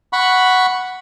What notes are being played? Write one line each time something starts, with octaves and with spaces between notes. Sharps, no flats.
F#5 B5 C#6